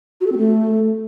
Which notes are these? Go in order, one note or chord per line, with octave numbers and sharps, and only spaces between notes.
F#4
A4
C4
A3